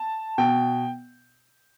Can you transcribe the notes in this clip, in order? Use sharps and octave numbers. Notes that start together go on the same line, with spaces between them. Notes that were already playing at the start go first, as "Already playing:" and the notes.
Already playing: A5
B2 G5